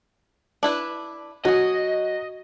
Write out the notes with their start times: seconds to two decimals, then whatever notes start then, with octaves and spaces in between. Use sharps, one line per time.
0.63 D4 E4 B4
1.45 F#3 F#4 G#4 D#5